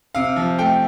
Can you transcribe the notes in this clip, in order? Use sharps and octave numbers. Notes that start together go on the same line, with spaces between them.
C3 F5
F3
A3 G5